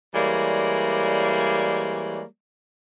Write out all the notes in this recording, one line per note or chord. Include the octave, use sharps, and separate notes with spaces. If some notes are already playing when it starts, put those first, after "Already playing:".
E3 G3 G#3 A#3 C#5 D5